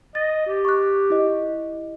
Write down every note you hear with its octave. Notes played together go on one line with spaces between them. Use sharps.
D#5 A6
G4
C#6 F#6
E4 D#5